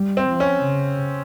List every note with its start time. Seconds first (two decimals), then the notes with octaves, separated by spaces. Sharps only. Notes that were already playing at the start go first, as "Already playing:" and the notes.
Already playing: G3
0.17 C4
0.29 F3
0.40 C#4
0.63 C#3